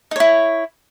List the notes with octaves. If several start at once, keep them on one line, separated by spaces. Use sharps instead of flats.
D#4 E4 C#5